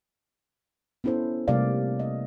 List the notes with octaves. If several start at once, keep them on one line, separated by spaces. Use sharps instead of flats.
B3 C#4 E4 A4 C5
C3 G3 A3 A#3 D5 F5
D#5